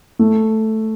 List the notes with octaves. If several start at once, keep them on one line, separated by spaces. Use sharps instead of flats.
A3